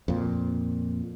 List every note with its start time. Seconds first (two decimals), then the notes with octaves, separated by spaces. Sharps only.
0.08 F2 A#2